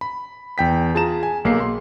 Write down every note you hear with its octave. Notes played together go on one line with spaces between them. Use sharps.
B5
E2 G5 B6
F4 G#4 A5 A#5 E7
G#5
B1 A#3 G#4 C7
C6